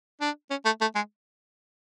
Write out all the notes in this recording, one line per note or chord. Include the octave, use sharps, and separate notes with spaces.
D4
C#4
A3
A3
G#3